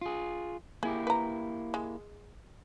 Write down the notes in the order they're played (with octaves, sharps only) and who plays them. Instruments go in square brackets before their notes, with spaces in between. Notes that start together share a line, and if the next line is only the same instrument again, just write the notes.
[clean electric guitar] F4 G#4
[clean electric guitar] A#3 E4 G4 [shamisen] G#4
[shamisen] B4 A#5
G#3